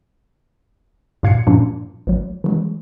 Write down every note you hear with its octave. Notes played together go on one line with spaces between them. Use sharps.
G2 A#2 F5 G#6 C7 C#7
G2 A#2 F3 A#3 C#4 D4
A1 F#3
E3 F#3 G#3